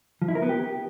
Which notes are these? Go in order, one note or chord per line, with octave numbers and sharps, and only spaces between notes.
F3
E4
A#4
B3
G4